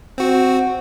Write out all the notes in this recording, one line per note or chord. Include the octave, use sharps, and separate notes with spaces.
C4 F#4